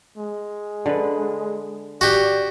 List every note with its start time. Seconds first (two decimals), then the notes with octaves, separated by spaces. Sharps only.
0.17 G#3
0.86 D3 B4
2.01 F#4 G4 D5